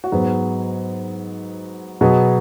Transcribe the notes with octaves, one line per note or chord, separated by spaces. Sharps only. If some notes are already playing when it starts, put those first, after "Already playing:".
F#4
G#2 F#3 B3 G#4
B2 F#3 B3 G#4